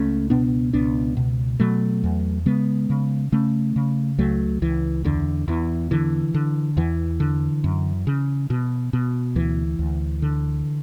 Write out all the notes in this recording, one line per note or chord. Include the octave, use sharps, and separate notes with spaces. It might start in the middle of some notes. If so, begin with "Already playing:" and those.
Already playing: C#2 A3 C#4
B2 B3 D4
C#2 B3 D4
B2
B2 F#3 A3
E2
C#3 G#3 B3
C#3
C#3 A3 C#4
C#3
C#2 F#3 A3
C#2 E3
E2 D3
E2 E3
D3 E3
D3
E2 E3
D3
F#2
C#3
B2
B2
D2 E3
D2
D3